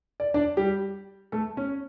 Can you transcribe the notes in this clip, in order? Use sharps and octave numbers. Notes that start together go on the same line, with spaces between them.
D5
D4 D5
G3 G4
A3 A4
C#4